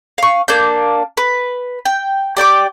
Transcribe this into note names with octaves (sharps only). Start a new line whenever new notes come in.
F5 C#6
A#3 D4 G6
B4
G5
G4 D5 G5 D6